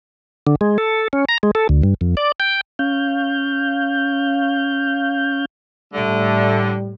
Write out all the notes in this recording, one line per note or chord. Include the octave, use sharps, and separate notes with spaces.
D3
G#3
A4
C#4
A#5
G#3
A4
D2
G2
F2
D5
G5
C#4 F5 G6
A2 D3 G3 A3